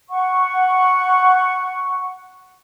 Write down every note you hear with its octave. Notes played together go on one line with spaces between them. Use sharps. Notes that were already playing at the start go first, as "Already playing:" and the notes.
F#5 C#6